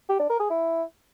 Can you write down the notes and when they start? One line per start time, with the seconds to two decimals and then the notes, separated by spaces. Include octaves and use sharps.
0.09 G4
0.19 D4
0.30 A#4
0.40 G#4
0.50 E4